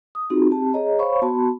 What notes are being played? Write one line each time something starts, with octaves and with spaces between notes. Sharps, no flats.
D#6
C4 D#4 F4 F#4 G#4
C4 G4 A5
G#4 C#5 D#5 A#5
C5 C#5 F5 B5 C#6
B3 F#4 A5 B5 C6